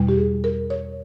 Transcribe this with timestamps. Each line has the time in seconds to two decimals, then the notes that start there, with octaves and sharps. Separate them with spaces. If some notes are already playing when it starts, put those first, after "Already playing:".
Already playing: E2 B2 G3
0.09 G4
0.17 G#4
0.44 A#4
0.70 C#5